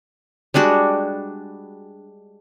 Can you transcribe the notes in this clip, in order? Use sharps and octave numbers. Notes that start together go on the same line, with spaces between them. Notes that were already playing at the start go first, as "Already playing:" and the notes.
G3 G#3 D4 F#4